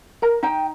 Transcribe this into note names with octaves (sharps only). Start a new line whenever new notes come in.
A#4 A#5
D#4 G5